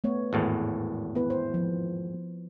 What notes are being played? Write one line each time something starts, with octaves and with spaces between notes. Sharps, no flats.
A3 B3 C#5
G#1 E2 A2
B3 E4 B4
C5
F3